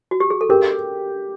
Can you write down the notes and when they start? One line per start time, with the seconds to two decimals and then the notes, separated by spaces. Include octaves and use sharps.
0.11 F#4
0.20 G4
0.30 G#4
0.41 A4
0.49 G4 A#4